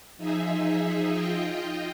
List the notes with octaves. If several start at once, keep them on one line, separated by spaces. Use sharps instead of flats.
F3 D#4 G#4 E5
F4 D#5 G5